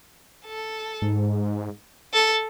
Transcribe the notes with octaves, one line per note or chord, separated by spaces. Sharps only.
A4
G#2
A4